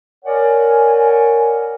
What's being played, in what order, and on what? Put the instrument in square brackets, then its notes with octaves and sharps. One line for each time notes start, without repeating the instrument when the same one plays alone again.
[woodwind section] A#4 C#5 D5 F#5 G#5